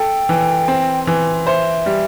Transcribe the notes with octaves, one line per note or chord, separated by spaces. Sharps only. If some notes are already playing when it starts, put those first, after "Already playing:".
Already playing: A4 G5
E3
C4
E3
C5 E5
G3